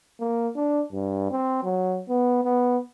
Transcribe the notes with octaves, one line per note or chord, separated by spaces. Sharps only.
A#3
D4
G2
C4
F#3
B3
B3